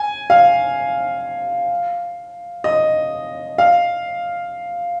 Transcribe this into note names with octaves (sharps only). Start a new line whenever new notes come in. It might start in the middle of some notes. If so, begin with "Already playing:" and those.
Already playing: G#5
F5
D#5
F5